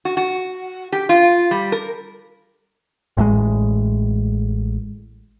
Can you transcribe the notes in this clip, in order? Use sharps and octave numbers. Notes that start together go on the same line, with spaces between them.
F#4
F#4
G4
F4
G3
A#4
A1 A2 C3 G#3